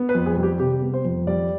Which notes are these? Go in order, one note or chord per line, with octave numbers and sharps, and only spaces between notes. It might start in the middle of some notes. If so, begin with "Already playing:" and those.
Already playing: B3
B4
F2
G#4
G3
G4
C3 G4
B3
C5
F2
G3 D5